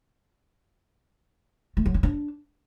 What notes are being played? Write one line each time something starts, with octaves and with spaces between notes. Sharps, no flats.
A3
F#3
C#4
D4